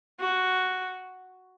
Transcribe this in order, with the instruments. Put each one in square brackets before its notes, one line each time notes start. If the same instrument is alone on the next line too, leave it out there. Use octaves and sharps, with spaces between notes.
[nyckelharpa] F#4